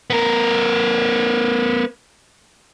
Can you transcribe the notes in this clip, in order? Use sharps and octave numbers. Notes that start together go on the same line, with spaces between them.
B3 A#4